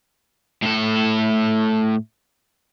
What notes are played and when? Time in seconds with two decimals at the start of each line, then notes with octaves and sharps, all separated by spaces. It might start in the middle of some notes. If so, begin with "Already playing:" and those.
0.62 A2 A4